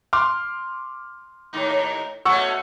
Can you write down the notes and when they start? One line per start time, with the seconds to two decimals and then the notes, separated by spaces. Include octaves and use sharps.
0.13 C6 D6 F6
1.53 D#2 A2 D#4
2.25 B2 A3 C#4 F#5 C#6 E6